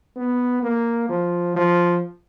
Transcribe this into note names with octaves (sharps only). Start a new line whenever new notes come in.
B3
A#3
F3
F3